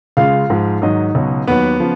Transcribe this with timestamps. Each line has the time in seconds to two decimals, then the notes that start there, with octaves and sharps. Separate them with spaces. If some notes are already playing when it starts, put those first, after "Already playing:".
0.17 C#2 C#3 G#3 F4 F5
0.50 G#2 F3 G#3
0.82 G#2 D#3 F#3 D#4 D#5
1.15 C#2 B2 F#3
1.47 D#2 D#3 F#3 B3 B4
1.80 C#3 F3